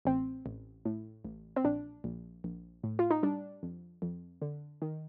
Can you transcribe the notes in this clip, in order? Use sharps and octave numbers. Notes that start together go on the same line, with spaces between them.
A1 C4
A1
A2
A1
C4
A#1 D4
A#1
A#1
A2
F4
D#4
G3 D4
F2
F2
D3
D#3